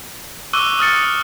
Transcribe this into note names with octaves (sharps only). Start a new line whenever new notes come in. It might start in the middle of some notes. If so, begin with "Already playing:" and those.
C#6 D6 E6 F#6 D#7 G7
D#6 F6 A6 C#7